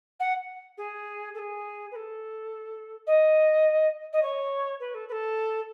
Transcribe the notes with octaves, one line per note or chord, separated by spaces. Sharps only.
F#5
G#4
A4
G#4
B4
A4
D#5
D#5
C#5
B4
A4
B4
A4